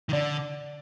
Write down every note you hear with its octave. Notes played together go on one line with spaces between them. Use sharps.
D#3
D3 D5